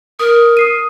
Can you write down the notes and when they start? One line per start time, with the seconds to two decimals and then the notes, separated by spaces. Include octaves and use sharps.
0.19 A#4 D#6
0.57 D#6 C7 D#7